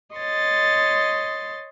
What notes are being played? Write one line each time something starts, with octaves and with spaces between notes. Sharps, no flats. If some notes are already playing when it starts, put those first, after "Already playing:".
C#5 D#5 C6 A6